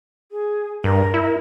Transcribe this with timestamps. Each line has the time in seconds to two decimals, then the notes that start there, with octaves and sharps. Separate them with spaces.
0.32 G#4
0.84 G2 A#4
1.14 E4